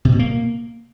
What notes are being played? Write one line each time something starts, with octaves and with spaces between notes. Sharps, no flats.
C3
B2
A#3